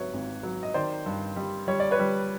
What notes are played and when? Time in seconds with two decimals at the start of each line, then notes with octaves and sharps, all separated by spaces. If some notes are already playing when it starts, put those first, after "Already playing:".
Already playing: G#1 F#3 B4 C#5 E5
0.14 G#1
0.43 F#3
0.63 D#5
0.74 D#3 C5 D5
1.06 G2
1.36 G3
1.68 G3 C#5
1.80 D5
1.91 B4 C#5
1.99 G3